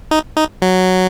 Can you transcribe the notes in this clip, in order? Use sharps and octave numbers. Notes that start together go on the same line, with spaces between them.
D#4
D#4
F#3